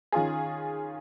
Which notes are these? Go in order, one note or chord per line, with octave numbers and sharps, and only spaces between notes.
D#3 C#4 F4 G#4